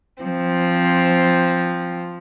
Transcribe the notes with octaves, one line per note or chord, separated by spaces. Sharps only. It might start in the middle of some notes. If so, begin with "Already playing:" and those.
F3 C4